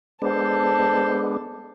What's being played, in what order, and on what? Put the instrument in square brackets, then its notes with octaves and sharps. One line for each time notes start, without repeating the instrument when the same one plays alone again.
[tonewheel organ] G#3 B3 D4 [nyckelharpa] A4 A5 [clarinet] C5